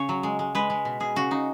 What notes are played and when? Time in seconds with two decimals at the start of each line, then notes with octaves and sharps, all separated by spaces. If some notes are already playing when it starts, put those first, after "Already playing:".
Already playing: C#3 C#5
0.09 F#3
0.23 G#3
0.39 G#3
0.55 G#3 B4
0.70 G#3
0.85 B2
1.00 B2 G#4
1.16 C#3 F#4
1.31 C#3 D#4